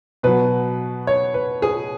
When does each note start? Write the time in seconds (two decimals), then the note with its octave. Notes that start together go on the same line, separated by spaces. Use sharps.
0.23 B2 F#3 B4
1.07 C#5
1.34 B4
1.62 G#4